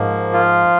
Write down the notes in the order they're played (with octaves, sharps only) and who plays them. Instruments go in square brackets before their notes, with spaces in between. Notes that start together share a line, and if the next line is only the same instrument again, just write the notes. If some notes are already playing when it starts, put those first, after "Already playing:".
Already playing: [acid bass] G#2 [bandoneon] F3 A#3
[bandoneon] F4